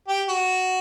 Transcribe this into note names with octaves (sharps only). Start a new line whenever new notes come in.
G4
F#4